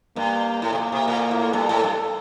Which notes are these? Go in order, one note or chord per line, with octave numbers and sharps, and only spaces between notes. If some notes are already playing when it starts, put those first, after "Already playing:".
G2 A#3
A2 A#3
C3
A#2
C3
A#2
A2
G2 A4
A2
G2